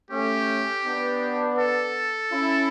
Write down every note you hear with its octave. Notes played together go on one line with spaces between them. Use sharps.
A3 C#4 G4
B3 D4
A4
C#4 E4